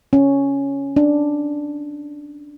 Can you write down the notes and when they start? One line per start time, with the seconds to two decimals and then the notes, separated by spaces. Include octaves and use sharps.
0.13 C#4
0.96 D4